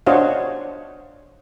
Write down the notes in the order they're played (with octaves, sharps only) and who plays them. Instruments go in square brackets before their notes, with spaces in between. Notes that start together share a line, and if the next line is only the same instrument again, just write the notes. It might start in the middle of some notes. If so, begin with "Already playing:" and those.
[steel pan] D4 F#4 C5 C#5 D#5 F5